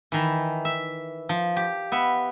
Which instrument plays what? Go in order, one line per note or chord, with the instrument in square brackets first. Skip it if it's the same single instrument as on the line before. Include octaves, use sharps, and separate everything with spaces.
[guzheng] D#3 E3
E5
F3
G4
B3 E5